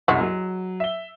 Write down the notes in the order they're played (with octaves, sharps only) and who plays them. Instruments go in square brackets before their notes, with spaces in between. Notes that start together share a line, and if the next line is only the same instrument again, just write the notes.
[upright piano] C2 F#2 [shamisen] G#3 F#4
[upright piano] F#3
E5 G7